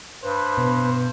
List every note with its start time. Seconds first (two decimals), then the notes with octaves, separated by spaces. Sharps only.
0.23 G2 B4 C5
0.58 B2